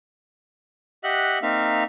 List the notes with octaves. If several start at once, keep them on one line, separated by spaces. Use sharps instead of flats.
G4 D#5 E5 F#5 F#6
A#3 C4 D#4 E5 F5